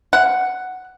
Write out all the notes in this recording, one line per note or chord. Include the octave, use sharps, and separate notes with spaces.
F#5